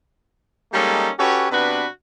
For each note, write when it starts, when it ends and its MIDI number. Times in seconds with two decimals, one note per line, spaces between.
0.72 1.10 55
0.72 1.10 56
0.72 1.10 58
0.72 1.10 61
0.72 1.10 63
0.72 1.10 69
1.19 1.46 61
1.19 1.46 66
1.19 1.46 67
1.19 1.46 69
1.19 1.46 71
1.19 1.46 73
1.51 1.86 48
1.51 1.86 59
1.51 1.86 62
1.51 1.86 66
1.51 1.86 71